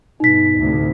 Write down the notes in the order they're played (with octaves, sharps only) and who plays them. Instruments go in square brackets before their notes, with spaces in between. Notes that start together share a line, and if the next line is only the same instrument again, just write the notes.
[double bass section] G2 B2 [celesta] D#4 B6
[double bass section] D2 A2 C3